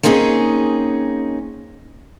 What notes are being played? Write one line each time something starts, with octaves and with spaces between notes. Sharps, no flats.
A#3 C4 C#4 D#4 G#4